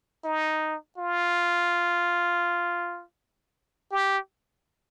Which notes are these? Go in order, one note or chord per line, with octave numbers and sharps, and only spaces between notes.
D#4
F4
G4